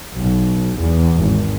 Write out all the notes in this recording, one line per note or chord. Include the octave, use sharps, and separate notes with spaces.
B1
E2
G#1